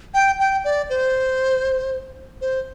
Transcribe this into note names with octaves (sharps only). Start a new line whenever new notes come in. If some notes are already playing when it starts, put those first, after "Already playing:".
G5
G5
D5
C5
C5